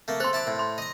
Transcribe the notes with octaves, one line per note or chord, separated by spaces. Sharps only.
A3 A#3
A4 C5 C6
E4 A5 D6
A2
C6
D#5 A#5